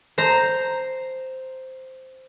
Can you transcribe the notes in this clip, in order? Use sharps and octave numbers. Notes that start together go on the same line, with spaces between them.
C5 A#5